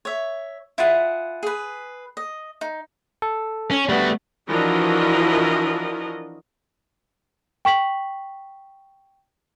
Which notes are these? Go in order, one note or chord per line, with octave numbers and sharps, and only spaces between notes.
C#5 E5
E4 F4 G#4 F#5
G#4 B4
D#5
D#4
A4
C#4
G3 A3 B3 F#4
E3 F3 D4 F#4 A#4 D#5
G5 C#6 B6 F#7